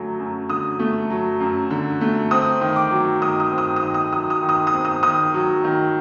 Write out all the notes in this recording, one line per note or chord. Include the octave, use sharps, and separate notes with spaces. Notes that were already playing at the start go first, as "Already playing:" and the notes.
Already playing: F#2 D3 F#3 A3
F#2
D3 D#6
A3
F#3
F#2
D3
A3
C4 D#6
D#3
D6
F#3
D#3 D#6
D#6
C4
D#6
D#6
D#3
D#6
F#3 D#6
D#6
D#3
D#6
D#6
C4
D#6
D#3 D#6
F#3
D#3